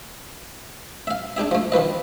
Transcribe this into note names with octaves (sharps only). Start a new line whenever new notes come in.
E5 F5
D4 D#4 G#4 E5
F3 A3
D#3 F3 B4 D#5